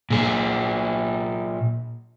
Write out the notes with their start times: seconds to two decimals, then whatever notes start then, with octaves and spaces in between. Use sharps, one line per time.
0.10 A#2 G#4